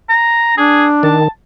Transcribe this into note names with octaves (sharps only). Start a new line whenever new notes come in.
A#5
D4 G#4
D#3 A5